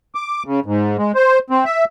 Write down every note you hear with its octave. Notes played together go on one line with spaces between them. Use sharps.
D6
C#3
G#2
G#3
C5
C4
E5